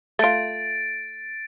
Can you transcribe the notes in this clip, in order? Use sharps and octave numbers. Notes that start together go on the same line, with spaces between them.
A3 F4 A6 D7